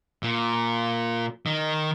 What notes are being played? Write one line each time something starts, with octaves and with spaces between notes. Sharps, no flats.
A#2
D#3